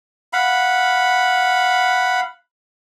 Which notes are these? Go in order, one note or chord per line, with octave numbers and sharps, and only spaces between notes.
F5 F#5 B5